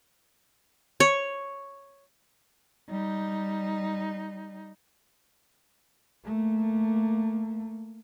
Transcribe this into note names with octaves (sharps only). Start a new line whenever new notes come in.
C#5
G3 D#4
A3 A#3